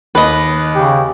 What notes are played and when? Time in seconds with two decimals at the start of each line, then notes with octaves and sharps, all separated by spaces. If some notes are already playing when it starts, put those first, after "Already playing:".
0.15 D#2 B4 D#5
0.75 C#3 G4